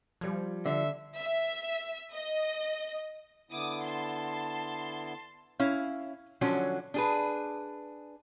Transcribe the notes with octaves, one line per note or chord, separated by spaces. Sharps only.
F3 G3 G#6
D3 E5
E5
D#5
D3 B3 E4 D6 D#6
A5 C6
C#4 E4 F5
D3 F3 F#3 C#4
D4 G#4 B4